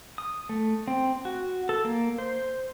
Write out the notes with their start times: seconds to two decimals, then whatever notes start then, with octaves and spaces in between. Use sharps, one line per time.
0.18 D#6
0.49 A3
0.88 C4
1.25 F#4
1.69 A4
1.85 A#3
2.18 C5